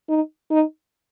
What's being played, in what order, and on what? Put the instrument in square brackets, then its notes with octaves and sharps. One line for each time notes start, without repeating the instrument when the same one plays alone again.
[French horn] D#4
D#4